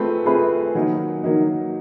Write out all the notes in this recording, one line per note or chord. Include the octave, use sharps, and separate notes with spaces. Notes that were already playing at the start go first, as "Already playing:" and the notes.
Already playing: A3 C4 F4 G#4 B4
A3 C4 F4 G#4 B4
D#3 F#3 A#3 D#4
D#3 F#3 A#3 D#4